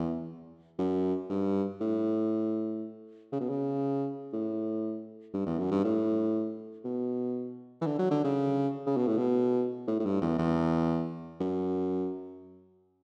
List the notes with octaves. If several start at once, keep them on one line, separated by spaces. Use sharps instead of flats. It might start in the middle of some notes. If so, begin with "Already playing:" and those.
Already playing: E2
F#2
G2
A2
C#3
B2
C#3
A2
G2
E2
F#2
G2
A2
B2
E3
D3
F#3
D3
C#3
C#3
B2
A2
B2
A2
A2
G2
E2
E2
F#2